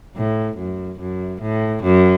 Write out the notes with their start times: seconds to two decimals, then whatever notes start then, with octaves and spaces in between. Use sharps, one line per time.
0.16 A2
0.58 F#2
1.00 F#2
1.42 A2
1.84 F#2